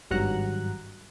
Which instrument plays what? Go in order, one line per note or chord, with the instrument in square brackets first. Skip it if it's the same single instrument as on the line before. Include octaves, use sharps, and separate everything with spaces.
[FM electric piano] G#1 G2 F#3 F#5 A#5 F#6